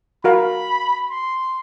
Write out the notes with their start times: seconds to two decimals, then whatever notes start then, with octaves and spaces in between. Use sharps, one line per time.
0.24 F#4 A#4 F5 B5
1.10 C6